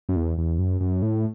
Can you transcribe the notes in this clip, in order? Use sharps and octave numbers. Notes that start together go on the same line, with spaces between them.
F#2
E2
E2
F#2
F#2
A2